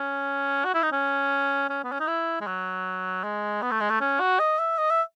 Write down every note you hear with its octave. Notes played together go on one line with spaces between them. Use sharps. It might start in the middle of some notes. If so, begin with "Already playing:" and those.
Already playing: C#4
F#4
E4
D#4
C#4
C#4
B3
C#4
D#4
E4
G#3
F#3
G#3
B3
A3
G#3
A3
C#4
F#4
D#5
E5
D#5
E5